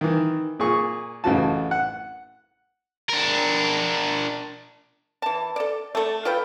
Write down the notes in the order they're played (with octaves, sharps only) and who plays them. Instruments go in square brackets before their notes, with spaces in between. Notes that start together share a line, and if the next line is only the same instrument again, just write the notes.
[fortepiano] D#3 E3
A#2 G#4 C#6
A1 C#3 F#4 A5
F#5
[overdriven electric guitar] D4 A#4
[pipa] E3 A5
A4 D5
A3 A4
F4 A4 B4 G5